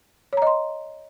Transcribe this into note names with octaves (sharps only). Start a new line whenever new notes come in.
C#5 D#5 A#5 C6